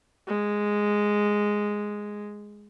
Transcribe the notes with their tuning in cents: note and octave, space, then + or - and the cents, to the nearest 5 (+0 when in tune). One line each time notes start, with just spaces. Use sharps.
G#3 -5